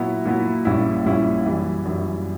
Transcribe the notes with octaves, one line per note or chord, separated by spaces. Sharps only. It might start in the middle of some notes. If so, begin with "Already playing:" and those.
Already playing: A#2 F#3 B3 E4
A#2 F#3 B3 E4
A#1 A#2 G3 C#4 E4
A#1 A#2 G3 C#4 E4
F#2 E3 G3
F#2 E3 G3